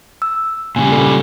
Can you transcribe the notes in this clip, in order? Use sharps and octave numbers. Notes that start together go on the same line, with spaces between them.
E6
A#2 C#3 G3 G#5
A4